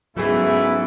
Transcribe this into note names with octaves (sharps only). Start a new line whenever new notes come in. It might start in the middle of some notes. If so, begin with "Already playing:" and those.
G#2 E3 F#3 A3 B3 C#4 E4 G#4